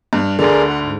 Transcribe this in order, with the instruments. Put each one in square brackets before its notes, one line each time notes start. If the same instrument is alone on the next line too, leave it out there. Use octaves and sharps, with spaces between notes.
[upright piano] G2
[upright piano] D2 D3 [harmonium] G#4 A#4 D5
[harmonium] F#5
G#2